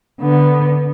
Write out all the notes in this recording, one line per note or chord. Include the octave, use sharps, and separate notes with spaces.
D3 B3